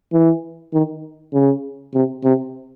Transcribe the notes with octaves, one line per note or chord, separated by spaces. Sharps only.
E3
D#3
C#3
C3
C3